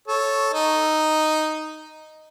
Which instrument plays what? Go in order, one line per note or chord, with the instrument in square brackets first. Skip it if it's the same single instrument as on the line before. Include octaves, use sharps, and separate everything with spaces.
[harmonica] A4 C#5
D#4